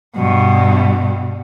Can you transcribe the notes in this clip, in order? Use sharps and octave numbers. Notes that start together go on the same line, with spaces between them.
G2 B2